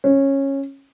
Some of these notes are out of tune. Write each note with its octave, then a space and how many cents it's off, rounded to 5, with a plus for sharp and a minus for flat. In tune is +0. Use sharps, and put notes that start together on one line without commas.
C#4 -15